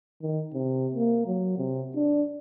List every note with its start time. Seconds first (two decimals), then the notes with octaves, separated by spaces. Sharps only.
0.22 D#3
0.54 C3
0.94 A#3
1.27 F#3
1.58 C3
1.96 D4